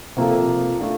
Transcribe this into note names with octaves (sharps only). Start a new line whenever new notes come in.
C3 F3 A#3 F4 A4
A3 D4 F4